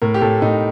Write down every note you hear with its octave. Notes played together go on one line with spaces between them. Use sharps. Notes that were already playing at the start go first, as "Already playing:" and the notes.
A2 A#4
G4
A2 A4
A2 D#4